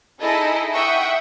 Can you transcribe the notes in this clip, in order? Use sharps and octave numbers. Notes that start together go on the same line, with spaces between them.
D#4 E4 G#4 A4 D#5
E5 F#5 G5 C#6 D#6